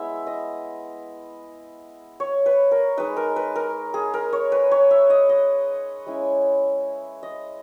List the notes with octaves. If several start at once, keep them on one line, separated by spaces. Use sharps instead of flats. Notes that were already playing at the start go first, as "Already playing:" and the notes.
Already playing: G#3 B3 E4 E5
D#5
C#5
B4
A#4
G#3 D#4 B4
A#4
B4
A#4
G#4
A#4
C#5
B4
C#5
E5
D#5
D#5
G#3 C#4 E4
D#5